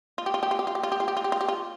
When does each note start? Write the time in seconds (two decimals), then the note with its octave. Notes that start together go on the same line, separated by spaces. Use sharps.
0.18 F4
0.26 G4
0.34 F4
0.43 G4
0.51 F4
0.59 G4
0.67 F4
0.75 G4
0.83 F4
0.92 G4
1.00 F4
1.08 G4
1.17 F4
1.24 G4
1.32 F4
1.41 G4
1.48 F4